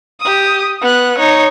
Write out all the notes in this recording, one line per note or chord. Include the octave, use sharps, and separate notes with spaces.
G4 D#6
B3 F#6
D#4 C#5